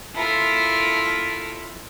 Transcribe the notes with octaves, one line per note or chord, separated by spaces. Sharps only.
E4 F4 A4 A#4